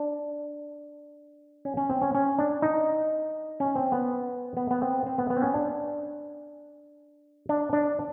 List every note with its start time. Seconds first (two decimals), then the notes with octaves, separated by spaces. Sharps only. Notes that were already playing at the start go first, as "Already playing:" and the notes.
Already playing: D4
1.65 C#4
1.77 C#4
1.90 C4
2.02 C#4
2.15 C#4
2.39 D4
2.62 D#4
3.60 C#4
3.76 C4
3.92 B3
4.57 B3
4.71 B3
4.82 C4
5.06 C4
5.18 B3
5.30 B3
5.37 C4
5.42 C#4
5.54 D4
7.49 D4
7.73 D4